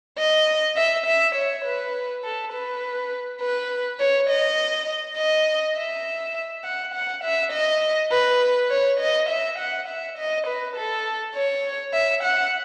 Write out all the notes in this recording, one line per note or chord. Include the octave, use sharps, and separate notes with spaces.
D#5
E5
E5
C#5
B4
A4
B4
B4
C#5
D#5
D#5
E5
F#5
F#5
E5
D#5
B4
C#5
D#5
E5
F#5
E5
D#5
B4
A4
C#5
E5
F#5